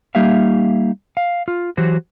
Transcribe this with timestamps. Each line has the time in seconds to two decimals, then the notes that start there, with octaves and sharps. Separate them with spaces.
0.15 G3 A#3 D#4 G4 E5 F5
1.17 F5
1.48 F4
1.77 E3 F#3 F#4 G4 C5